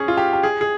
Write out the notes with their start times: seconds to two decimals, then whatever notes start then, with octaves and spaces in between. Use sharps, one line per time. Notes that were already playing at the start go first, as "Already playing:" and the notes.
Already playing: C#4 G#4
0.08 F4
0.17 G4
0.33 G4
0.43 G#4
0.61 G#4